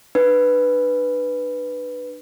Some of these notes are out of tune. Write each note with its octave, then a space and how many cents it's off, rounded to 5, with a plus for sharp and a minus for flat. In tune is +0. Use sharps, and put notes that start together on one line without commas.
D4 +30 B4 +0